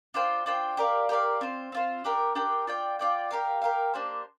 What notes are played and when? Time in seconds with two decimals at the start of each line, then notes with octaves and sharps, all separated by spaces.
0.14 D4 F4 C5 G5
0.46 D4 F4 C5 G5
0.77 G4 A#4 D5 F5
1.09 G4 A#4 D5 F5
1.41 C4 F4 C5
1.72 C4 F4 C5
2.04 D4 G4 A#4 G5
2.35 D4 G4 A#4 G5
2.67 F4 D5 G5
2.99 F4 D5 G5
3.31 G4 A#4 F5
3.62 G4 A#4 F5
3.94 A#3 D4 G4 C5